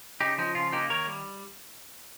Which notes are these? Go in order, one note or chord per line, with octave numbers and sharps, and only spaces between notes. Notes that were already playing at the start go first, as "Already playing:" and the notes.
C#3 D#4 G4
F3 D#4
C#3 F4
A#3 D#4 G4
D#3 A#4 C#5
G3